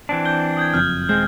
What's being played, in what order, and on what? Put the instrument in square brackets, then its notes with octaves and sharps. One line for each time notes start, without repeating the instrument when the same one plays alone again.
[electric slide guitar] E3 C4 D4
[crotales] G6 G7
D#6 G6 G#6
[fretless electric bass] F#1 F2 [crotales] F6 G6
[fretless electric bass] D#1 G#3 [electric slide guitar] C4 [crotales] G6